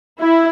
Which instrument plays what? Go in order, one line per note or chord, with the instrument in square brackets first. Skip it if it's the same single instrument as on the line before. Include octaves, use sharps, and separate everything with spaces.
[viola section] E4